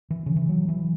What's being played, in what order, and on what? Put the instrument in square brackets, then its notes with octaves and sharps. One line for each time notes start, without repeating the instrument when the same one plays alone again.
[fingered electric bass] E3
C#3
E3
F#3
E3